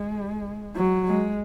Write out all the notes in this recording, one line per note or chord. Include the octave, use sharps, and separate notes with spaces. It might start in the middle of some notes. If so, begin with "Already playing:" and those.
Already playing: G#3
F#3
G#3